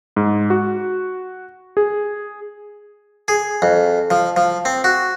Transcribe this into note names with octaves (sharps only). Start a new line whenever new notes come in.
G#2
F#4
G#4
G#4
F2
F3
F3
C4
F#4